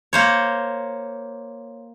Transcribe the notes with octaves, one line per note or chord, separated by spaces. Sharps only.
A#3 C5 C#5